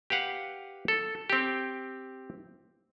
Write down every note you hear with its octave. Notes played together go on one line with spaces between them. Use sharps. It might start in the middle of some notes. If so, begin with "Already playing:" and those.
G4 B4 F5 F#5
A4
C4 G4